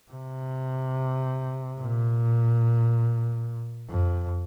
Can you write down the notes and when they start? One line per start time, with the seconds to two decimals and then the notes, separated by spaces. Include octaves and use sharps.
0.12 C3
1.80 A#2
3.89 F2